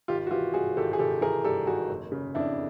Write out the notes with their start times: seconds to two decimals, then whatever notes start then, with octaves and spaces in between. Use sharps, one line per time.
0.08 G#1 F4 G4
0.27 F#4
0.31 E3 F4 G4
0.54 G2 F#4 G#4
0.77 G#1 G4 A4
0.93 G#4
0.98 G#1 G4 A4
1.21 E3 G#4 A#4
1.44 G2 G4 A4
1.66 G#1 F#4 G#4
1.89 F#1
2.12 C#3
2.35 F2 D4 E4